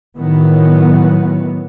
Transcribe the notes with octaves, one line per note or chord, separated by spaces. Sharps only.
A2 D#3 E3 F#3 B3